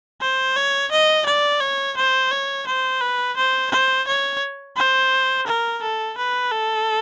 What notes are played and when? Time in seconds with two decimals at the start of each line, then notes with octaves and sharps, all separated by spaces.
0.21 C5
0.56 C#5
0.92 D#5
1.26 D5
1.61 C#5
1.97 C5
2.32 C#5
2.67 C5
3.01 B4
3.37 C5
3.71 C5
4.07 C#5
4.77 C5
5.47 A#4
5.82 A4
6.17 B4
6.52 A4